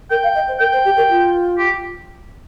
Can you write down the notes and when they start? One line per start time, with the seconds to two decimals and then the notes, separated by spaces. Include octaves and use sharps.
0.10 A#4 G5
0.23 F5
0.34 D#5
0.47 C5
0.59 A#4 G5
0.72 C5
0.84 G4
0.96 A#4
1.09 F4
1.58 G4